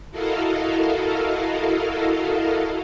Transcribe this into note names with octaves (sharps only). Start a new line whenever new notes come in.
E4 F#4 A4 A#4 D#5 F5